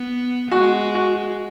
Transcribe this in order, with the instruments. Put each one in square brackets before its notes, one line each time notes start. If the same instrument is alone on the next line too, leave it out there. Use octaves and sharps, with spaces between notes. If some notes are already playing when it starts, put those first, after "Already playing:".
Already playing: [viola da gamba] B3
[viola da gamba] G#3 [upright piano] F#4
[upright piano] F#4